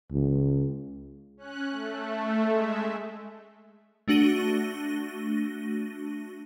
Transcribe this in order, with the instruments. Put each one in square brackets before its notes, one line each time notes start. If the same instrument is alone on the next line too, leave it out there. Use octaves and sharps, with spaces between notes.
[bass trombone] C#2
[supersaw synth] C#4 F#6
A3
G#3 E5
[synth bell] A3 D4 F#4 A#6 D#7 G7